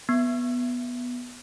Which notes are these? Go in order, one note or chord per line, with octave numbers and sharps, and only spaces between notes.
B3